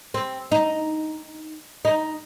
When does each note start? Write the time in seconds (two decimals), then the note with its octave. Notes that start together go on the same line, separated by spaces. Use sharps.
0.14 C4
0.51 D#4
1.85 D#4